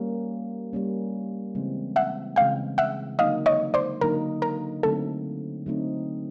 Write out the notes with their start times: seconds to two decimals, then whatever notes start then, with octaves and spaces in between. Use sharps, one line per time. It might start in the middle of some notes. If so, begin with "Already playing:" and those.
Already playing: G3 A#3 C#4
0.73 G3 A#3 C#4
1.55 C#3 E3 G#3 C4
1.96 E5 F#5
2.36 C#3 E3 G#3 C4 F5 G5
2.78 E5 F#5
3.19 D3 F#3 A#3 D#4 D#5 F5
3.46 C#5 D#5
3.74 C5 D5
4.01 D3 F#3 A#3 D#4 A#4
4.42 A#4
4.83 D3 F#3 A3 C4 D#4 A4
5.66 D3 F#3 A3 C4 D#4